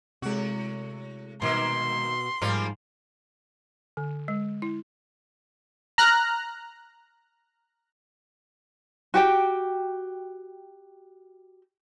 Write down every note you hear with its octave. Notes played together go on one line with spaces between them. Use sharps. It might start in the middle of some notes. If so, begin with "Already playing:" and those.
A2 C3 G#3 F#4
B2 D#3 A#3 C4 C6
G#2 F3 G3 A#3 F4
D3
G#3
E4
A#5 F6 F#6
F#4 G4 G5